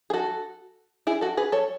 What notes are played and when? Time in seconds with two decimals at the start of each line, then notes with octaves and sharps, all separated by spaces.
0.10 G#4
0.13 F#4 A4
1.07 E4 G#4
1.21 F#4 A4
1.37 G#4 B4
1.52 A4 C#5